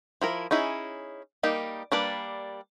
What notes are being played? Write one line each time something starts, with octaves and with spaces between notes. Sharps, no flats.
F3 E4 A#4
C#4 D#4 E4 G#4
G3 A#3 D#4 G4
G3 A#3 D4 B4 D5